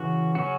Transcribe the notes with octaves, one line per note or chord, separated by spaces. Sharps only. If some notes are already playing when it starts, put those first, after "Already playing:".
Already playing: C#3 E3 C#4 F#4
C#3 F#3 C#4 F#4